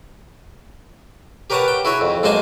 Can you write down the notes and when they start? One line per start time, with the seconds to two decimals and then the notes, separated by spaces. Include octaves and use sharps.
1.50 G4 A#4 B4 C#5 F#5 A5
1.68 G5
1.85 E4 F#4 G#4 C#5
2.01 F2
2.23 F#2 G#3 A#3 C5 G#5 A5